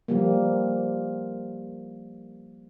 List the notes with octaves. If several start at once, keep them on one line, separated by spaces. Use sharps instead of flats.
F3 G3 A#3